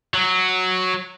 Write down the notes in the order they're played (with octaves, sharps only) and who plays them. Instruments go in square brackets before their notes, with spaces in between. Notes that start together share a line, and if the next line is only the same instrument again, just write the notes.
[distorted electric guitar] F#3